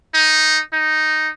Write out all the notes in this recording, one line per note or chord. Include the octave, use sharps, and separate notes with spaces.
D#4
D#4